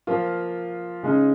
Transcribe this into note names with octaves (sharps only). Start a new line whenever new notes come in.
F3 A#3 F4
C#3 G#3 D#4